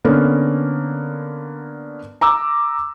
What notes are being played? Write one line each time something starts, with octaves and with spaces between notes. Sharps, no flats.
D3 A#3 B3 C#4 A#4
A#5 D6 E6